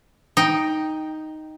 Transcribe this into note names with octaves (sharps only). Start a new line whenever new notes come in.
D#4 G5